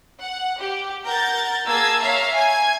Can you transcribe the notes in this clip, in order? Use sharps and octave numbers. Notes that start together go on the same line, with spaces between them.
F#5
G4
A#4 F#5 A#5 G6 A6
A#3 G#4 A5 E6 G#6
C#5 E5 F5 A#5
G#5 G#6